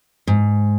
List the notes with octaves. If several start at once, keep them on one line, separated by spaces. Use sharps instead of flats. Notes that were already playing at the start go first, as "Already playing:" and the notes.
G#2